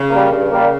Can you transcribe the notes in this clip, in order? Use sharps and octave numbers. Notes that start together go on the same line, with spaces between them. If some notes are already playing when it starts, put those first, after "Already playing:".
Already playing: C#3
G3 A#3
G2 C#3
G3 A#3